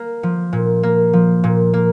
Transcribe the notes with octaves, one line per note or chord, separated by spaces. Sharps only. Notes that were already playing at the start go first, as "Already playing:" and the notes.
Already playing: A#3
F3
A#2
A#3
F3
A#2
A#3